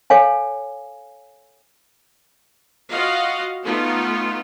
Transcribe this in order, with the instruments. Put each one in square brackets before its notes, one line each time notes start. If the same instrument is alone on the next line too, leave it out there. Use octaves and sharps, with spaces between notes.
[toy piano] A4 C#5 F5 G#5
[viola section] F4 F#4 D#5 F5 F#5
A3 B3 D#4 F4